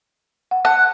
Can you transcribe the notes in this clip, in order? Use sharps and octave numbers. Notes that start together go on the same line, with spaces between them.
F#5
F#5 A5